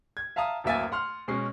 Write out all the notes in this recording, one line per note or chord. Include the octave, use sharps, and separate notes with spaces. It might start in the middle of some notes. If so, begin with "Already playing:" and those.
G#6
E5 F5 A5 A#5 D#6
D1 F#2 A#3 E5 G#5 A6
F#5 C6 F6
B2 G#3 C#4 C7